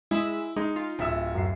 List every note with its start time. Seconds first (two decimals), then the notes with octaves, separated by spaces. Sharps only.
0.11 G#3 E4 B5 E6
0.56 G#3 D#4
0.76 F4
0.99 D1 E5 E6
1.35 F#2 C7